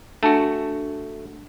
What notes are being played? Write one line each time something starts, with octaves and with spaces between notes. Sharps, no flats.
A3 D4 F#4 A5